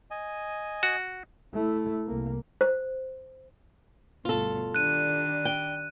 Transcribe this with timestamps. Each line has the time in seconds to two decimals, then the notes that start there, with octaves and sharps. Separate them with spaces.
0.11 D#5 G#5
0.83 F#4
1.54 A3 E4
2.07 C2 A#3
2.61 C5
4.25 D2 G2 B2 F4 A4
4.75 D#3 G3 D4 F#6 D#7
5.45 G5